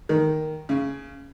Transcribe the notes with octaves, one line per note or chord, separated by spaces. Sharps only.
D#3
C#3